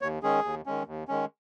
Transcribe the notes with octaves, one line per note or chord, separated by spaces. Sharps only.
D#2 C#5
D#3 G#3 C#4 G#4
D#2
D#3 G#3 C#4
D#2
D#3 G#3 C#4